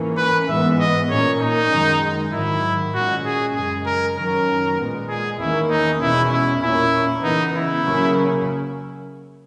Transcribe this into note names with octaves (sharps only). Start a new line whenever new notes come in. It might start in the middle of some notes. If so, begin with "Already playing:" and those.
Already playing: G#2 E3 A#3 C#4
B4
G#2 E3 G#3 B3 E5
D#5
A#2 A#3 C#4 C#5
D#4
F#2 D#3 G#3
G#2 D#3 F#3 E4
A#2 G#3 C#4 F#4
G#4
F#2 C#3 G#3 G#4
A#4
F#2 D#3 F#3 C#4 A#4
A#2 G#3 B3
G#4
E2 D#3 A#3 C#4 E4
D#4
E2 B2 G#3 C#4 E4
E4
A#2 A#3 C#4 E4
C#3 E3 B3 D#4
E4
C#3 F#3 A#3 C#4